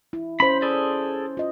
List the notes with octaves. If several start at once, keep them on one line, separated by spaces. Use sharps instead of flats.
E4
C#4 C5 B5
G#4 A4 D5
F4 D#5